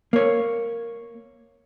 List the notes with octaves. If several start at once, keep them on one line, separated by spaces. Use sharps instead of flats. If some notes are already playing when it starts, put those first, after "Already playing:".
A#3 C#5